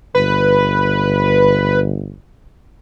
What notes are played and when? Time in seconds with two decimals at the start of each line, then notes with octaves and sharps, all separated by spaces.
0.15 G1 B4